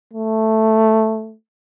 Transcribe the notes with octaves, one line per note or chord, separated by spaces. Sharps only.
A3